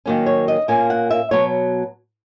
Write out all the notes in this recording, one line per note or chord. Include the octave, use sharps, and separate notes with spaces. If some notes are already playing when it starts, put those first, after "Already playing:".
D#3 F#3 A#3 C#4
C#5
D#5
A#2 A#3 C#4 G#5
F#5
E5
B2 F#3 B3 C#5